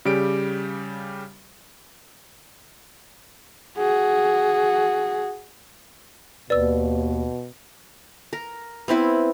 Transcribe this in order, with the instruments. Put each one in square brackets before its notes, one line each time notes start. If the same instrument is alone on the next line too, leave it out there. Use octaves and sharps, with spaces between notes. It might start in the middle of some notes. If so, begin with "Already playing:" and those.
[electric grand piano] C#3 G3 G4 D7
[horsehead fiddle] F#4 G#4
[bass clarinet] D#2 [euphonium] B2 [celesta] B4 [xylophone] D5 E6
[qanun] A#4
B3 C4 E4 B4